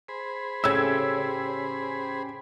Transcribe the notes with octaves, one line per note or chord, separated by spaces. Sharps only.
G#4 C5 B5
A2 C#3 C#4 G4 E5 E6 G#6